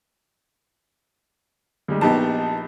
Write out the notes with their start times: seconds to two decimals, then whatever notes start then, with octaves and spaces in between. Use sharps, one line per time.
1.88 D2 G3 G#3
2.01 A#1 B3 D#4 G4 A5